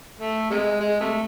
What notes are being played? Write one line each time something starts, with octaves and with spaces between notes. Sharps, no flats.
A3
C3 G#3
G#3
C3 A3